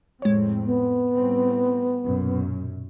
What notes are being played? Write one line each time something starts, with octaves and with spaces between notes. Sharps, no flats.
F2 A2 G#3 C4 C#5
B3
A2 G3 C4
B1 F#2 A#2